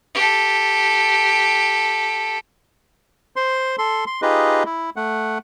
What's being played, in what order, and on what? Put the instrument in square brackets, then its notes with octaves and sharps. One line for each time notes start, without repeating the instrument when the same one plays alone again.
[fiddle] G4 A4
[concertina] C5 C6
A4 C6
C6
D#4 F4 G4 G#4 B4 D#5
E4
A3 F#5